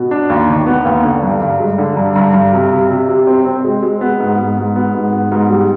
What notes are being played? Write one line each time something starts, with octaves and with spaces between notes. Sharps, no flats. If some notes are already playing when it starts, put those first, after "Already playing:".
Already playing: B2
D4
D#2
D#3
B3
D#2
D3
G2
G2
G#3
D3
G2
G2
G2
C3
C3
C3
C3
C4
C4
G#3
G#3
B3
G#2
G#2
G#2
B3
G#2
B3
G#2
G3